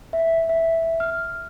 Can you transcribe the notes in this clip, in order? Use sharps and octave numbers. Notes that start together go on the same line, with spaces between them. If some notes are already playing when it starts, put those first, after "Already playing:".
E5
E5
F6